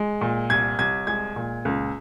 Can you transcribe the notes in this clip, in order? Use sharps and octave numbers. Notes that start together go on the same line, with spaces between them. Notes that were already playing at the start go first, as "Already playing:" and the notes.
Already playing: G#3
A#2
C2 G#6
C2 G#6
G#3 G#6
A#2
C#2